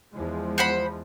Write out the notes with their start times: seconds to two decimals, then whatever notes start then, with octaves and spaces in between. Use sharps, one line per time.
0.13 E2 F3 G#3
0.58 C5 F#5 B5